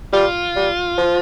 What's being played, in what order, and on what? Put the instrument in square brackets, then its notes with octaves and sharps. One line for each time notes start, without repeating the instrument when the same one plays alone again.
[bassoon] G3 [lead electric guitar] F4
[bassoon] G3
F3